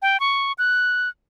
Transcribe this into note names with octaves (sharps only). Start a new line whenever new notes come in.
G5
C#6
F#6